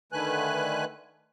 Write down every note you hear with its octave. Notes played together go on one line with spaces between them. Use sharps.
D3 D#3 A3 B4 G#5 F#6